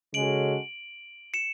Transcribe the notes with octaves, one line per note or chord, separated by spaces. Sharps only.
C#3 G#3 C#4 F#4 A4 D7 F#7
C#7 E7